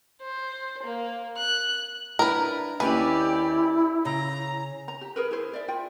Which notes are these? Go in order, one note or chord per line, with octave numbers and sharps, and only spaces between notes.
C5
A#3
F#6
D4 E4 A#4 B4
D#2 C#4 E4 G4 B4 D5 G#5
C#3 A#5
A#5
G4
G#4 A#4 B4
E4 G#4 C5
D5 E5
F4 G5